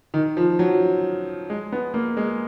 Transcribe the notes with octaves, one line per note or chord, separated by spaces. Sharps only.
D#3
F3
F#3
G#3
B3
A#3
G#3